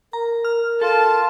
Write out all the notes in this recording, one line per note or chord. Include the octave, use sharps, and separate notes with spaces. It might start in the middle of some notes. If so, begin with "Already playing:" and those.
A#4 A#5
F6
F4 A4 A5